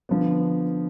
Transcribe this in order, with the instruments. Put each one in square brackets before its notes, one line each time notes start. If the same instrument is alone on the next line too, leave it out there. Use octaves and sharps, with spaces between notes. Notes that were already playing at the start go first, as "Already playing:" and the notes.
[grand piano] D3 F3 B3